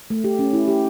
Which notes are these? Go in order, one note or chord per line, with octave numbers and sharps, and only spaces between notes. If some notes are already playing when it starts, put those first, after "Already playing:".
A3
G4
C#4
E4
G4